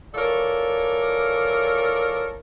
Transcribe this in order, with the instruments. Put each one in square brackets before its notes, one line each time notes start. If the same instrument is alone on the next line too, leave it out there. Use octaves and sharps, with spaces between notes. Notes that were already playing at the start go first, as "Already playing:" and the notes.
[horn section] E3 F4 A4 A#4 C#5 D5